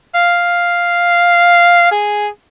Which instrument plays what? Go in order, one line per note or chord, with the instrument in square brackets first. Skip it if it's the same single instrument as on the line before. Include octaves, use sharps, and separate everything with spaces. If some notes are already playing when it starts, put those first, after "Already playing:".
[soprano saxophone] F5
G#4